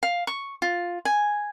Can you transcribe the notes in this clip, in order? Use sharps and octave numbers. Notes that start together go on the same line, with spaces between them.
F5
C#6
F4
G#5